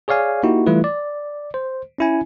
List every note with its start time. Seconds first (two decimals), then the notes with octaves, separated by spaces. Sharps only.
0.08 G#4 C#5 D5 F5 G#5
0.43 A#3 D#4 E4 F#4 G4
0.66 E3 G3 A3 E4 F4 B4
0.84 D5
1.54 C5
1.98 C#4 E4 G#5